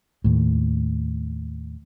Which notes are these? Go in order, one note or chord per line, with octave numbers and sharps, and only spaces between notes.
D#2 A2